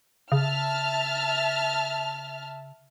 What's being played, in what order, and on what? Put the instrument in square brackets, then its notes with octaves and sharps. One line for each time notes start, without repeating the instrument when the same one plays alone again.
[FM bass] C#3 [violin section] E5 A5 F6